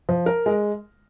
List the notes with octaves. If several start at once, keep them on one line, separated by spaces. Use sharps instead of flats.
F3
A#4
G#3